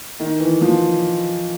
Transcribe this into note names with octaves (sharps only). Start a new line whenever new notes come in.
D#3
E3
F3